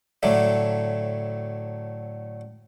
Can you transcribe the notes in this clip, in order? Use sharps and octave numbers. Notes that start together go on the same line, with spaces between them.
A2 D3 F#3 A3